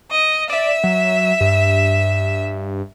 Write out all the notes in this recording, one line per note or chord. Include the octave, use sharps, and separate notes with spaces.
D#5
D5 E5
F#3
G2